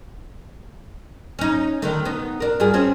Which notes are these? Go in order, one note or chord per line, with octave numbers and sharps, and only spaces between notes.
C#4 D#4
D3 D#3 A3
B3 D#4
D4 A#4
G2 F4 G#4
C4 C#4 G#4